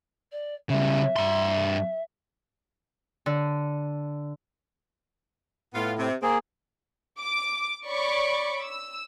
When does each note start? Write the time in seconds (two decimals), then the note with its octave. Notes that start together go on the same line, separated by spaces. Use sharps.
0.32 D5
0.69 C#3 G3 E5
1.17 G2 C6
3.26 D3
5.74 A2 B3 F4
5.99 C3
6.23 A#3 C4 G#4
7.18 D6
7.86 C#5 D5 B5 C#6 D6
8.63 E6